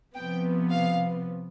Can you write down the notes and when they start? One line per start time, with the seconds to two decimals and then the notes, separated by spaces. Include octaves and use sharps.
0.16 C3 F3 B3 G5
0.70 F5